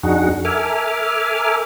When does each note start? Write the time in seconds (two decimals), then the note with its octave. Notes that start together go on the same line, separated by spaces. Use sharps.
0.03 F2 D4 D#4 F#4 G#4 F#5
0.45 A4 A#4 E5 G#5 D6 F6